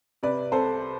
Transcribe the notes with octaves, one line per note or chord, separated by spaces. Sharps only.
C3 B4 D5
C2 A4 C5